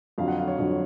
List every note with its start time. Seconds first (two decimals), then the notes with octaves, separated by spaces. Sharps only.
0.18 F2 D3 F#3 F5
0.28 F#5
0.38 F5
0.48 C#5
0.58 F2 D3 F#3